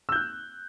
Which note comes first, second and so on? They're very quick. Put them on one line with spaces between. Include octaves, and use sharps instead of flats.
E6 G6 F#6